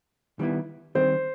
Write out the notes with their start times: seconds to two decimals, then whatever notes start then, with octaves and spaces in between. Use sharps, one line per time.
0.39 D#3 G3 B3 E4
0.95 D#3 G3 C4 C5